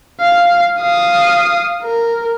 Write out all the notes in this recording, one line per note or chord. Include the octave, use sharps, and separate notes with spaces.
F5
F5 D#6
A#4